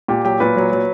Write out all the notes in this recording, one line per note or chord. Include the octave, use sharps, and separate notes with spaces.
A#2 G4
F#3 G4
A#2 B4
F#3
F#3